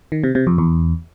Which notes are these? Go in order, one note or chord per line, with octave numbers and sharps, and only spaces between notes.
D#3
C3
C3
F2
E2